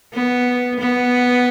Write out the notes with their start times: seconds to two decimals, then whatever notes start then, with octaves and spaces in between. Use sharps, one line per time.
0.14 B3
0.79 B3